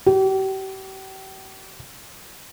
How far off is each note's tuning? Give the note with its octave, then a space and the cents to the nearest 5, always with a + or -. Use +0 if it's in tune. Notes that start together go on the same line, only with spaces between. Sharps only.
G4 -40